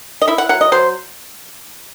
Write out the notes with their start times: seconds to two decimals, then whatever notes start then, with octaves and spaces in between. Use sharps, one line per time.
0.22 D#5
0.28 E4 E5
0.38 F#5
0.49 F#3 F#5
0.61 D#5
0.72 F#3 C5